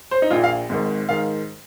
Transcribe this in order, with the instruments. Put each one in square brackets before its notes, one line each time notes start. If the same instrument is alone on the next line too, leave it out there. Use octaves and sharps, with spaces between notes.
[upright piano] C5
D#4
A#1 A#2 F4
F5
G#1 G#2 D#3
G#2 D#3 F5